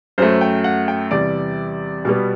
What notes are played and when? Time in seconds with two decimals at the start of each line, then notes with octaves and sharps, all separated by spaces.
0.18 F#2 F#3 A3 C5
0.41 G5
0.64 F#5
0.88 G5
1.11 E2 C3 G3 D5
2.05 B2 G3 B3